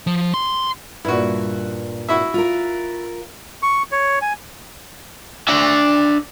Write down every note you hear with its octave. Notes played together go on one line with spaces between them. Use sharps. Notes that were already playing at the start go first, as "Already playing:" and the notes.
F3
C6
G2 A#2 E4 F#4
E4 F#4 E5
F4 A#4
C#6
C#5
G#5
D4 E5